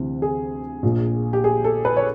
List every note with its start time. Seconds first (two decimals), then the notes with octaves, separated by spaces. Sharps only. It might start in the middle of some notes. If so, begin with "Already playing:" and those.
Already playing: D2 C3 E3
0.22 G#4
0.83 A#1 A#2
1.33 G4
1.44 G#4
1.64 A4
1.85 B4
1.97 C#5